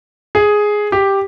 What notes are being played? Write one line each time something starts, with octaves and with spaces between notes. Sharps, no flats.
G#4
G4